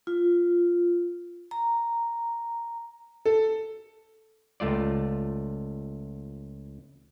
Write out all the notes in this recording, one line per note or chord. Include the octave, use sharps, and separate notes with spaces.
F4
A#5
A4
C#2 A3 F4 D5